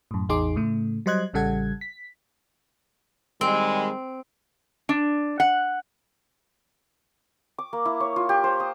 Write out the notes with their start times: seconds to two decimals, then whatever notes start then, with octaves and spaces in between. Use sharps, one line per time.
0.11 F#2 A2
0.29 A1 E2 D#4 G#4 C6 D6
0.56 A2 C#3 A3
1.06 F#3 G3 C5 D#5 F#6 G#6
1.34 A1 C#3 G3 A4 F#5 G#6
1.81 B6
3.41 D#3 G3 G#3 C4
4.89 D4
5.40 F#5
7.58 D6
7.73 A#3
7.85 E4
8.00 C#5
8.16 F4
8.29 G4
8.44 C5
8.60 D#6